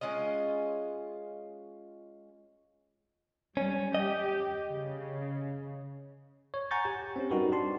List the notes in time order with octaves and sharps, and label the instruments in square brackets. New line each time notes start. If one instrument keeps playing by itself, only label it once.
[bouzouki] G#3 C#4 F4 D#5
[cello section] G3 [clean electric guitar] C#4
[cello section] G4 [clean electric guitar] D#5
[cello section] C#3
[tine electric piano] C#5
F#5 G#5 A#5 C#6 G6 A6
G4
C4 C#4 G4
G3 D#4 F#4 A#4 B4
D4 G4 A5 C6